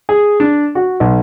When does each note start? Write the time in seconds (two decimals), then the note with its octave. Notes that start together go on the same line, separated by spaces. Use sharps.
0.09 G#4
0.40 D4
0.75 F#4
1.00 B1